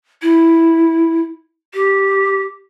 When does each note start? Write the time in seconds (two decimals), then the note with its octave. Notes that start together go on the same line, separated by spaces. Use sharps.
0.22 E4
1.74 G4